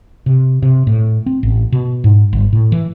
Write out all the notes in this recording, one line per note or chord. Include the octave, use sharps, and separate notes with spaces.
C3
C3
A2
C4
A1
B2
G#2
G1
A2
E3